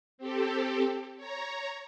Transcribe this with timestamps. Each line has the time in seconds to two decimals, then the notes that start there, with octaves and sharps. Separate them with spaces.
0.18 C4 G4 A4
1.17 C#5 A#5